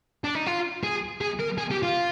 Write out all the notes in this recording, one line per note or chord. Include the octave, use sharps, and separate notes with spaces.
D4
D#4
F4
G#4
G#4
A#4
G#4
G4
F4